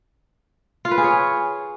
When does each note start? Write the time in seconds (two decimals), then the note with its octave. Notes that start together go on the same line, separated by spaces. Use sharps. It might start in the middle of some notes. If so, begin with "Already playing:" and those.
0.85 F4
0.91 B4
0.98 G#4
1.04 C#5